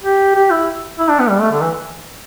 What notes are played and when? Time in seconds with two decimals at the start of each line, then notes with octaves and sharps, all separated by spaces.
0.03 G4
0.35 G4
0.51 E4
0.99 E4
1.09 D4
1.20 B3
1.29 G3
1.40 A3
1.51 D3
1.61 E3